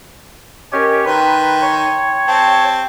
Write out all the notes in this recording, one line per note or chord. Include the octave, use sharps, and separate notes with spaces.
C#4 G4 A#4 C#5 D#5
D#3 B4 G5 A#5 C6
C#5
C4 G4 A5